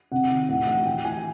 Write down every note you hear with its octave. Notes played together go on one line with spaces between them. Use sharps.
C3 F#5
D#3
A2 F#5
E3 F#5
A2 G5
E3 G#5